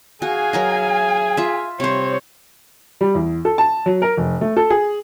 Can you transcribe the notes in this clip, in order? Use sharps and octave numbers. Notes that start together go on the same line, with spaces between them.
F#4 G#4 F5 G#5
F#3 A#4 D#5
F4 E5
C3 G3 C5 C#5
G3
E2
A4
A5
F#3
A#4
F1
A3
A4
G#4